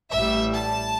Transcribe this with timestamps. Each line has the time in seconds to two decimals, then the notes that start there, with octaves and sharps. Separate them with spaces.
0.12 A1 A2 G3 E5
0.53 A5